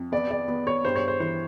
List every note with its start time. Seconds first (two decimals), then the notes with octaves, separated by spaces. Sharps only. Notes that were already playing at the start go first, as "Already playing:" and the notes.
Already playing: F2
0.12 B3 D5
0.31 D5
0.48 B3
0.67 C#5
0.85 G2 C5
0.96 C#5
1.08 C5
1.20 E3 C5